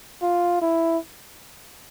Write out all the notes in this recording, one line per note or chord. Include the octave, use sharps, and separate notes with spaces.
F4
E4